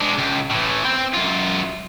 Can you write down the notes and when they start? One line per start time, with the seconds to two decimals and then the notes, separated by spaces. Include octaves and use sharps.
0.01 G#3 D4
0.18 C#2
0.51 A2 E3
0.85 C4 G5
1.14 F#2 F4